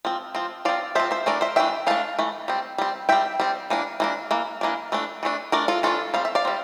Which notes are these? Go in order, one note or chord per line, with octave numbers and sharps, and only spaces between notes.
F3 C4
F3 C4
F3 C4 D5 F5
F3 C4 C5 E5
C5 E5
E3 A3 D4 A#4 D5
C5 E5
E3 A3 D4 E5 G5
E3 A3 D4 F5 A5
E3 A3
G3 C4
G3 C4
G3 C4 E5 G5
G3 C4
E3 A#3 D4
E3 A#3 D4
E3 A#3
E3 A#3 D4
E3 A3 D4
E3 A3 D4
E3 A3 D4 A#4 D5
F4 A4
E3 A3 D4 F4 A4
G3 C4 F5
E5
D5 F5
G3 C4